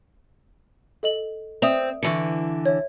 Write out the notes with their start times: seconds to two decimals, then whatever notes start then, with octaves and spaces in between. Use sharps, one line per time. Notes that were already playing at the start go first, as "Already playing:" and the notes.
1.03 A4 D#5 F#7
1.62 C4 D5 E5 D#6
2.03 D3 E3 C#6 C#7
2.66 C#5 E5